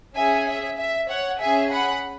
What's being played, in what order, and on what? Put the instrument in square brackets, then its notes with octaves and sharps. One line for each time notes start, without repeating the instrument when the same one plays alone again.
[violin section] C#4 G#4 E5 G#5
E5
E5
C#5 F#5
C#4 G#4 E5 G#5
F#5 B5